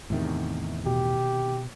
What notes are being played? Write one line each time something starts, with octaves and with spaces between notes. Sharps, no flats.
E2 A2 C3 D#3
B2 G4